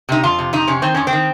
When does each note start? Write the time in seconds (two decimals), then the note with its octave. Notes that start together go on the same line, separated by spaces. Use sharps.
0.09 C3 D#4
0.23 F2 F4
0.39 C3
0.53 F2 D#4
0.67 C3 C#4
0.82 D#3 C4
0.94 F2 C#4
1.07 C4
1.13 D#3